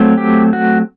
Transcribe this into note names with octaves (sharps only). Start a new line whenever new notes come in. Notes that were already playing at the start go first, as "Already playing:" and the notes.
Already playing: F#3 A3 C4
G4
F#4